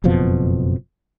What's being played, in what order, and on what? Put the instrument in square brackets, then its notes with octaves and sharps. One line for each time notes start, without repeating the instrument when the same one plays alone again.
[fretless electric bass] F#1 F2 B2 F3